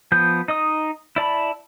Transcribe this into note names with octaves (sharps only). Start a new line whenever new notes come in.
F3 B3 G6
D#4 D#5 D#6
E4 D5 A5 B5